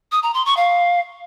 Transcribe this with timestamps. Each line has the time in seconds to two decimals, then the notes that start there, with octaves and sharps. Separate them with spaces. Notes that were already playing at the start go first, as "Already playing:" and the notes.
0.12 D#6
0.23 A#5
0.34 C6
0.46 C#6
0.57 F5